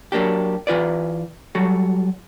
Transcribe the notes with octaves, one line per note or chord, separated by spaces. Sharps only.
F#3 A#3 D4 G4
E3 F4 B4 D5
F#3 G3 F#4 A4